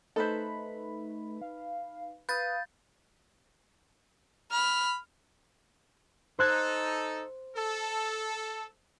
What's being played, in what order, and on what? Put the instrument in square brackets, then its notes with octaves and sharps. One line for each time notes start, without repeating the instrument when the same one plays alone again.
[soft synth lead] A3 [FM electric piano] D#4 B4 B5 [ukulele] A4 C5
[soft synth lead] F5
[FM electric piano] B4 D#6 [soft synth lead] F5 [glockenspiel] G6 A6
[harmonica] B5 [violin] F6
[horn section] D#4 A4 [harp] C5 F#6 G#6
[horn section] A4